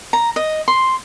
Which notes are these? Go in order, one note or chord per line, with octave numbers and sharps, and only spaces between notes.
A#5
D#5
C6